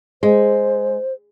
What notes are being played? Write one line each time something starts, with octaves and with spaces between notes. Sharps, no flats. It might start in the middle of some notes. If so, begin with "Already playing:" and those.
G#3 C5